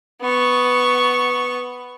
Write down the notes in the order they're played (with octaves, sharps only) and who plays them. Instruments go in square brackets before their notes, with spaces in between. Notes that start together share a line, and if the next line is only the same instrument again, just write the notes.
[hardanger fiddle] B3 C#6